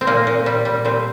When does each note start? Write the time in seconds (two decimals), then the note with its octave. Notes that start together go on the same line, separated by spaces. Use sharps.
0.01 C4
0.07 A#2 A#3
0.27 A#2
0.46 G3
0.65 G3
0.85 A#2 C4